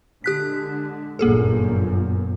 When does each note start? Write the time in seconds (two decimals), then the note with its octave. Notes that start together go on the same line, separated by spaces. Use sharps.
0.24 D3 G#3 G4 F#6 B6
1.19 G1 F#2 A#2 A#3 G#4 A4